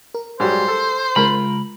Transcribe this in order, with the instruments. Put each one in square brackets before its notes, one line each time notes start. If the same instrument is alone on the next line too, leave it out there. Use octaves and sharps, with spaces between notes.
[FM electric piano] A#4
[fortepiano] G#2 F#3 G3 [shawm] C5
[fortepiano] A4
[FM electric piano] C#3 G#3 [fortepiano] F4 A#4 [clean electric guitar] B5